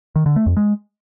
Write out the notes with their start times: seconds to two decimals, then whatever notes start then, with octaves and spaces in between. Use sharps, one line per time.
0.16 D#3
0.26 D3
0.36 A3
0.46 F2
0.57 G#3